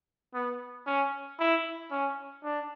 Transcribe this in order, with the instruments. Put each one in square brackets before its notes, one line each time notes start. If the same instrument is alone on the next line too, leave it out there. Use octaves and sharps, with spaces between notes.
[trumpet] B3
C#4
E4
C#4
D4